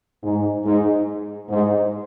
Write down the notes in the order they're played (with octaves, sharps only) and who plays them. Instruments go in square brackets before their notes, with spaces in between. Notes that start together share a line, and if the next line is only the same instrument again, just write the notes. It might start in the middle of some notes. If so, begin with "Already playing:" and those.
[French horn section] G#2
G#2
G#2